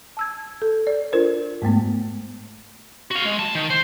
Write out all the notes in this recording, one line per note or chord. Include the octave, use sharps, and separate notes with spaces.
A5 E6 G#6
A4
D5
D4 F4 A#4 C5
G#2 G#3 A3 B3
F#4 F5
G#3
A5
D#3
C5